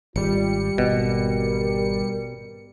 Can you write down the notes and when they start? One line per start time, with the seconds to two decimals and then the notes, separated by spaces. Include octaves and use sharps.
0.16 G#1 G3 F4 C#7
0.78 G#1 B2 A#4